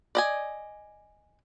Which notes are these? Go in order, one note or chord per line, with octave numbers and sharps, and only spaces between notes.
D5 D#5 G#5